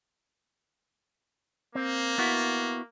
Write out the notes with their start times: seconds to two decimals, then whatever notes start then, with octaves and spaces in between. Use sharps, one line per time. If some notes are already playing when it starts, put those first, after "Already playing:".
1.75 A#3 C4
2.18 B3 E4 F#4